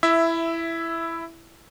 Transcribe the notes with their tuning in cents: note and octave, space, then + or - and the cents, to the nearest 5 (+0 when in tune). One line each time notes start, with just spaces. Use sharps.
E4 +10 E5 +0